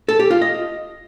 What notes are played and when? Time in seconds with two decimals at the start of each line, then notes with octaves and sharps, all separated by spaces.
0.08 A4
0.20 G4
0.31 F4
0.42 D#5